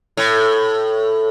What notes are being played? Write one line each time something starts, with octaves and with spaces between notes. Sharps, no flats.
A2